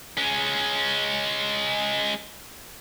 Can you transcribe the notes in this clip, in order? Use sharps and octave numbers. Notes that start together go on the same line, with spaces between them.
G#3 C#4